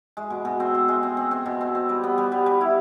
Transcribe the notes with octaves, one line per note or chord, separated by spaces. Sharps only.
G#3
B2
B2
C4
C4
G#3
C4
C4
C4
B2
C4
C4
G3
B3
G3
G3
G3
E4